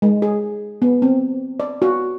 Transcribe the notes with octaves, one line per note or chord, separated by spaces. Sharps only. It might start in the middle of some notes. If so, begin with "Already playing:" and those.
G#3
G#4
B3
C4
D5
F#4